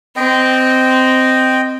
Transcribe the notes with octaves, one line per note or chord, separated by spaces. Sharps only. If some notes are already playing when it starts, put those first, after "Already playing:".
C4 D#5 G5